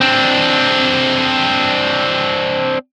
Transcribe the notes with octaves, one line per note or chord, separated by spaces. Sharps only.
C4 D4